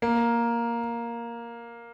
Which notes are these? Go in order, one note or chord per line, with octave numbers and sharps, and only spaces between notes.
A#3